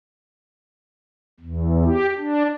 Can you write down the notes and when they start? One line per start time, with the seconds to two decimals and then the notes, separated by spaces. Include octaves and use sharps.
1.40 E2
1.86 G4
2.18 D4